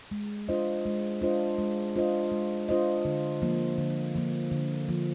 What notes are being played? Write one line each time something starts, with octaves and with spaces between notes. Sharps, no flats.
G#3
D4 F4 C5 D#5
G#3
D4 F4 C5 D#5
G#3
D4 F4 C5 D#5
G#3
D4 F4 C5 D#5
D3
F3 A#3
D3
F3 A#3
D3
F3 A#3